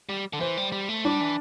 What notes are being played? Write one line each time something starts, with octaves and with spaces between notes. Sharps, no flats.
G3
D3
E3 C5
G3
G3
A3
G3 D4
E3